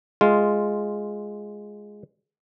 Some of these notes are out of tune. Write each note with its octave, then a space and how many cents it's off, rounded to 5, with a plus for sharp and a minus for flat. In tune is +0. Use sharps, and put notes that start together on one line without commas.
G#3 +0 F4 +0